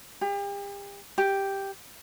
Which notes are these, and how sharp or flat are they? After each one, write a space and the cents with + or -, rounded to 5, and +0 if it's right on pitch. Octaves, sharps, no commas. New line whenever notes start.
G4 +40
G4 +0